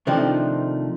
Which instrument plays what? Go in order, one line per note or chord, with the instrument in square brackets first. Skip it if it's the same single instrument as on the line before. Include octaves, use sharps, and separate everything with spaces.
[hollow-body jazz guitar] C3 D#3 F3 A3 D4 D#4